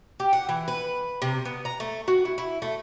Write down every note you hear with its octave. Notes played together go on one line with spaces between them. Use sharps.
G4
F#5
E3
B4
C3
B3
A#5
A3
F#4
E4
E4
A3